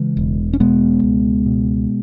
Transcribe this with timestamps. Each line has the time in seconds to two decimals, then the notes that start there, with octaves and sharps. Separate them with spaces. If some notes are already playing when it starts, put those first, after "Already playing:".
Already playing: C#3 E3 G#3
0.17 E1
0.53 C#4
0.60 B2 G#3 B3
1.03 C#2
1.46 B2